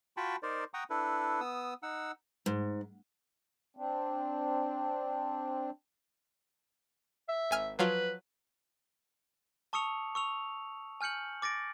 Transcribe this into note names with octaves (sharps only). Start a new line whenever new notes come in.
F4 F#4 G5 A5 B5 C#6
D#4 A#4 C5 D5
F#5 G5 A#5 C#6 D#6
D4 E4 A4 B4
B3 D#6 E6
D#4 F#5 E6
G#2
C4 D4
E5
G#1 G#5 F6
F3 F#3 F4 B4
A5 C#6 D#6 E6 C#7 F7
C#6 E6 F7
G#5 F6 G6 C#7 F#7
D6 A6 A#6 D7